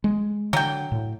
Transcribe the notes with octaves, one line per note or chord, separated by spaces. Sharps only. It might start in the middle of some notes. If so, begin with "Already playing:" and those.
G#3
D3 F#3 G5
A2